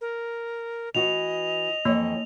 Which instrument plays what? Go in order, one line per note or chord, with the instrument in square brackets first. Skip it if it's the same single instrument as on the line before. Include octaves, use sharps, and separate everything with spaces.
[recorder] A#4
[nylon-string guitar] E3 F#4 [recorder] D#5 [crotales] F7
[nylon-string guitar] F2 E3 C#5 [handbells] A#3